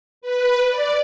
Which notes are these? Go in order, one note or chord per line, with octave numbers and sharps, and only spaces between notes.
B4
D5